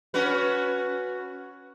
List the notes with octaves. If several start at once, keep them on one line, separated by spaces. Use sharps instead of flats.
C#4 F#4 B4